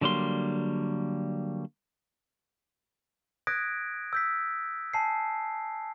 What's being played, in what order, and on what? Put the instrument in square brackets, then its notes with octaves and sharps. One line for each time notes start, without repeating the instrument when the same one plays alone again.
[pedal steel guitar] D3 F#3 G3 A#3 C6
[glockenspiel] D#6 F#6 G#6 A#6 B6 D7
E6 G6 B6
G#5 A5 C7